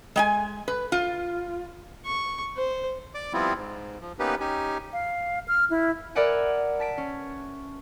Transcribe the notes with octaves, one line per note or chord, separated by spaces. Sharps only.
G#3 G5 G#5
B4
F4
C#6
C5
D5 D6
F3 G3 B3 C4 E4 F4
G#2
F3
A#3 B3 C#4 D#4 G4 B4
C#4 D#4 G4 G#5
F5
F6
E4
A#4 B4 D5 E5 F#5 G#5
A5 B6 D7
C#4